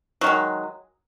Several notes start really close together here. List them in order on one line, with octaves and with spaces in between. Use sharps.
F#3 D#3 G#3